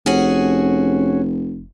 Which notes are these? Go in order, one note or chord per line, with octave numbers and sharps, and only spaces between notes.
F1 C#4 F#4 G#4